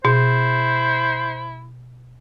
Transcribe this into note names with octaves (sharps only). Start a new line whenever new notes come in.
B2 E4 C5